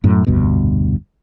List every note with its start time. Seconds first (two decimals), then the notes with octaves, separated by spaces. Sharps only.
0.04 F#2 A2 F#3
0.27 F1 D2 G2 B2